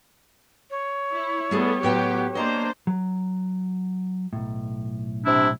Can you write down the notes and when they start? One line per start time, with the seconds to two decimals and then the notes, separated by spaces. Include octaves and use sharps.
0.70 C#5
1.13 E4
1.51 G3 A3 B3 G#4 A4
1.83 A2 F#3 B3 G4 G5
2.35 A#3 D4 C5 D#5 A#5
2.87 F#3
4.33 B1 A2
5.25 C3 D4 E4